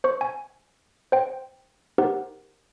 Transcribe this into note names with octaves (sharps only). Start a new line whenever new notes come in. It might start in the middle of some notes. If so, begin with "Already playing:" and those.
C5 C#6
G#5
C5 G5
D#4 G4 A#4 C5 F#5